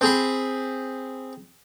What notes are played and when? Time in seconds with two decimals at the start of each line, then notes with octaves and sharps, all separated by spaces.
0.01 C4 G#4 B5